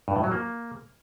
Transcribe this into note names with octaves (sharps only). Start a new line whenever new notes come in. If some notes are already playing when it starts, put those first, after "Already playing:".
G2
A2
F#3
A#3